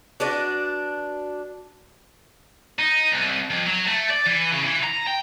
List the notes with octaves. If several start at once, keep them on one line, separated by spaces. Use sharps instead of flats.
D4 F#4 B4 D5
D#4
C2
F2
F#3
A3
D5
E3
C#3
E3
A#5
G5